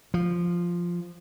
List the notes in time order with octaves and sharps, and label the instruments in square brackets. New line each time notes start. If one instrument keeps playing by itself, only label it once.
[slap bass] F3